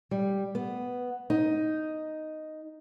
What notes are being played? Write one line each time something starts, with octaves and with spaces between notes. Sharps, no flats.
G3
B3
D#4